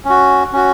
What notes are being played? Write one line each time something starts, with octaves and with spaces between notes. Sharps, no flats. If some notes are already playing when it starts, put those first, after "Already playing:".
C#4 F#4
C#4 F#4